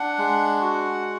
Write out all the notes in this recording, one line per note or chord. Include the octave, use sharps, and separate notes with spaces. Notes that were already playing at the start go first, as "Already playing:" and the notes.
Already playing: D4 F#5
G#3
F#4